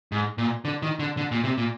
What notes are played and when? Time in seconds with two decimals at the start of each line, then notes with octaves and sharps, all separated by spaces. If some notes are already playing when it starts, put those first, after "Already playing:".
0.12 G#2
0.38 A#2
0.65 D3
0.82 D#3
0.99 D3
1.17 D3
1.31 A#2
1.44 C3
1.58 A#2